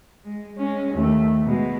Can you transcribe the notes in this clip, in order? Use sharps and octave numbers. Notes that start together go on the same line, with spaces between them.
G#3
G#3 C#4
D#2 A3
B2 G#3